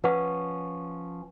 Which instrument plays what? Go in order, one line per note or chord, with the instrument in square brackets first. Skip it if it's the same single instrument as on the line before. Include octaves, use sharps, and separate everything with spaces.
[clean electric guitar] F3 C#4 [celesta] B4 F#5